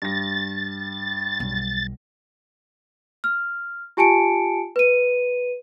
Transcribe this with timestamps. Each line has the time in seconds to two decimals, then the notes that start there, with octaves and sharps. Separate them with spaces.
0.02 G2 A6 A#6
1.40 B1 G3
3.24 F6
3.97 F4 G4 G#5 A5 C#7 D7
4.76 B4 D#7